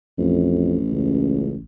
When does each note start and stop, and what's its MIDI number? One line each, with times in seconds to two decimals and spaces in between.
0.18 1.62 33
0.18 0.77 41
0.91 1.55 37